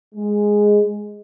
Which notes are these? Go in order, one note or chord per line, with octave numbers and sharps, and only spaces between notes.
G#3